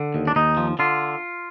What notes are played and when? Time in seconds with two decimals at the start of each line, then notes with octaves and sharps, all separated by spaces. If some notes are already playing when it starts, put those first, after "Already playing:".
Already playing: D3
0.15 D#2
0.27 D4
0.36 D#2 D#4
0.57 F3
0.79 D3 F4